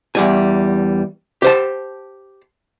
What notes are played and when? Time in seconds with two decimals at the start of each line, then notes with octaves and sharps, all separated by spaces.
0.15 E2 G3 G#5
1.42 G4 C5 A5